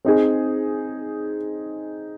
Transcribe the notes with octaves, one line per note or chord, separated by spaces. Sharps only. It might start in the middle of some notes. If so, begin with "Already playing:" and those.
C4 D#4 G#4